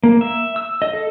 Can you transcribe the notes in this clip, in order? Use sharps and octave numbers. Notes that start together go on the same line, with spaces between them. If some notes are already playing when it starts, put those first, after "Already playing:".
A#3
E5
E6
D#5
A4